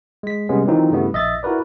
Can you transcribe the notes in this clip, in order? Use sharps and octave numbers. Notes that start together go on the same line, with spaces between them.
G#3 B6
C3 G3 G#3 B3 C#4
D#3 E3 F#3 C4 D#4 F4
G2 C#3 G3 A3 B3 E4
A#1 D#5 E5 A6
E4 F#4 A#4 B4 D5